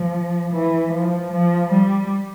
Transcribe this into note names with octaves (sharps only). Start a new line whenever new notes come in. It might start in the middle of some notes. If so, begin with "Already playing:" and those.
Already playing: F3
E3
F3
F3
G3